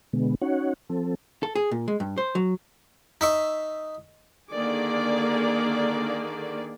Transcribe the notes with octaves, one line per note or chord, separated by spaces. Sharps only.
B2 D3 G#3 B3
C#4 D#4 F#4 C#5 F#5
F3 C4 A4
A4
G#4
A#2
G#3
G2
C5
F#3
D#4 E5 C#6
D3 D#3 A#3 G#4 D5